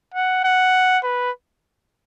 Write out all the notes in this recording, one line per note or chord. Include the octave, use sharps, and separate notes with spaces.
F#5
F#5
B4